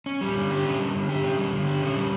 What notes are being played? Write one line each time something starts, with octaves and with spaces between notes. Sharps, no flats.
C#4
G3
D3
G4
C#4
G3
D3
G4
C#4
G3
D3
G4
C#4
G3